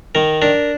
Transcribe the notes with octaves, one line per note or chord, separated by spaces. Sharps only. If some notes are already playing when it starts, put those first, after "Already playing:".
D#3 A#4
D4 A#4